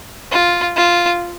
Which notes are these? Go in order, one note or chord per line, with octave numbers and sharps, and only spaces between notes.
F4
F4